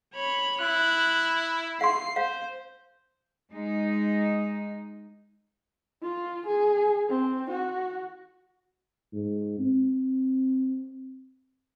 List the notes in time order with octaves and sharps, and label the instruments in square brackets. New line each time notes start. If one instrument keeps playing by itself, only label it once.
[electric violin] C#5 B5
[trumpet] E4 [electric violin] F#6
[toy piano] F5 C6 [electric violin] C7
[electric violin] C5 [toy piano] F5
[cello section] G#3 D#4
[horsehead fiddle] F4
G#4
C4
F#4
[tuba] G#2
C4